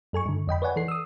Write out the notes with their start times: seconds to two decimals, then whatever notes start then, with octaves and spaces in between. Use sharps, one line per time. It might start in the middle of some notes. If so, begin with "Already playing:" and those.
0.13 F#2 A4 G#5 C#6
0.26 G2 D3
0.47 F2 D#5 G5 B5
0.62 B4 C#5 D5 F#5 G#5
0.76 E3 A4 C7
0.88 D#6 E6